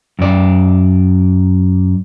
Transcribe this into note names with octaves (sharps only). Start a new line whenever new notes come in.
F#2 D5